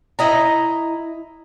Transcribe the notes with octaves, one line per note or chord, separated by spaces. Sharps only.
E4 D#5 A#5